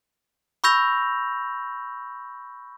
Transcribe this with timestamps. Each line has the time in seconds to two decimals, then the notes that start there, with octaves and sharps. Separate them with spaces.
0.64 B5 C#6 E6 G6 A#6 F7